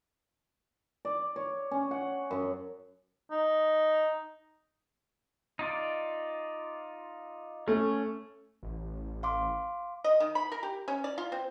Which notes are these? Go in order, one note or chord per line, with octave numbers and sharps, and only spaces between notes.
D5
C#5
C#4
F#5
F#2
D#4
D#4 F4 D5
A3 C#4
A1
F5 C6 D6
D#5
D#3
B5
A#4
G4
C#4
D5
F4
C4